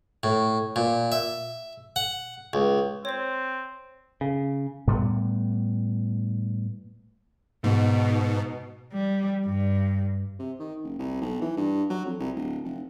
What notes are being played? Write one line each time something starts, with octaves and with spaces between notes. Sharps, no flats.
A2
A#2
E5
F#5
C#2
C4 C5 C#5
C#3
A2 G3 B3
G#2 B2
G3
G2
C3
D#3
F#1
C2
B1
E3
G2
F#3
F2
C2
D1
F1